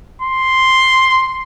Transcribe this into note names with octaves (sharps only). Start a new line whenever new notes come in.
C6